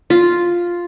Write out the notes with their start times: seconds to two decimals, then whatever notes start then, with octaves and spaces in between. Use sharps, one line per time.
0.10 F4